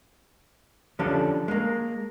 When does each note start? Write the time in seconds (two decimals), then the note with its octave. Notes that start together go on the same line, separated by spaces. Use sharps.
0.99 D3 F3 C#4 D4 G4 A4
1.48 G#3 A#3